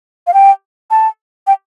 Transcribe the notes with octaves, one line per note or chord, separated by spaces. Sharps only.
F5
G5
A5
G5